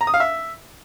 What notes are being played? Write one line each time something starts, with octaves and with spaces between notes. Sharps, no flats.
A#5
D#6
F5
E5